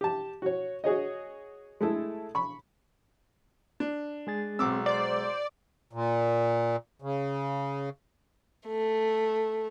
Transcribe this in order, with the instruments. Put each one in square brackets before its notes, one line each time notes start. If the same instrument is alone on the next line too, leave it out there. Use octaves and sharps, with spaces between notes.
[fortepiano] G4 A5
F#4 C#5
F#4 G#4 C#5 D#5
G#3 A3 E4 A4
B5 C#6
D4
[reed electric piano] G#3 G#4 A6
[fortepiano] B1 D6 E6 [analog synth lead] C4
[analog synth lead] C5 [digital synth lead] D5
[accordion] A#2
C#3
[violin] A3